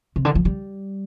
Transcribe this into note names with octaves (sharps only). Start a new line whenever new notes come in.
C3
D3
F3
G3